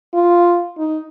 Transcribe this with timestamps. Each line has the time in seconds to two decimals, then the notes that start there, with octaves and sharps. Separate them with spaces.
0.14 F4
0.78 D#4